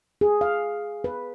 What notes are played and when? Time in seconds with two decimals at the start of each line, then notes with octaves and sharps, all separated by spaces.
0.21 G#4
0.41 F5
1.04 B4